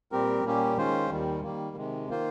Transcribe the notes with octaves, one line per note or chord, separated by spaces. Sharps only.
A#2 G3 C4 G4 A#4
A#2 G3 A#3 C#4 G4
D#3 G#3 C#4 F4 C5
D#2 D#3 G3
D#3 G3 A#3
C3 D#3 G#3
D#3 A#3 F4 C5